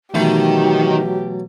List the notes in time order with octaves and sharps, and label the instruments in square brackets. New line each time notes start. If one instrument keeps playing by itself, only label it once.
[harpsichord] B2 E3 A3 [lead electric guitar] D#3 [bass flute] F#3 [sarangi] G4